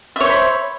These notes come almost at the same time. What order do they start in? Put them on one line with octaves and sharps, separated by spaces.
E5 C#5 C5 B5